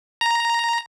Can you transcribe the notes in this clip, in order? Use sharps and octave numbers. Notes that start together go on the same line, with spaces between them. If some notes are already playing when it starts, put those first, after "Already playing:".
A#5